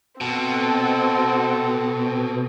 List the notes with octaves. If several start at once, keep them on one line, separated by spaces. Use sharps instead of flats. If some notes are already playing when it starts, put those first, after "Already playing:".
B2 C4 A4